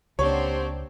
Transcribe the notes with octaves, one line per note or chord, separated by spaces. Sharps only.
C#2 A#3 C4 D4 G4 C5 C#5 F#5